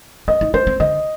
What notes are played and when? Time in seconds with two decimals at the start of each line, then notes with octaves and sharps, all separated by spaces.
0.28 D4 D#5
0.41 D#4
0.54 D4 C5
0.67 C4
0.80 D3 D#5